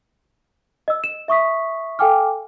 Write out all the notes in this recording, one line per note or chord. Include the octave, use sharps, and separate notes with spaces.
D#5 E6
E7
E5 C#6 D#6 B6
A4 F5 G5 G#5 D6 F6